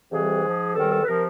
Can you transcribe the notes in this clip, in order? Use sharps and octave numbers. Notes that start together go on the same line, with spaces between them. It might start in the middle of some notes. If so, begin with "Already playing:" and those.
F2 C3 E3 G3 G#4
G#2 F3
E2 C3 D#3 G3 A4
A4
B4
C3 F3 A#4